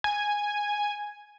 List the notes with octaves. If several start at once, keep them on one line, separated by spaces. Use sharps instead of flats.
G#5